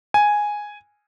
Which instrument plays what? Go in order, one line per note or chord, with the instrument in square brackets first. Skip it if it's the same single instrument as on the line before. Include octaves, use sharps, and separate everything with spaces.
[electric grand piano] G#5